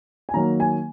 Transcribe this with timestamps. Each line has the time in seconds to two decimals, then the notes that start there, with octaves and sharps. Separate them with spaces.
0.29 G#5
0.34 D#3 F#3 A#3 A#5
0.60 G#5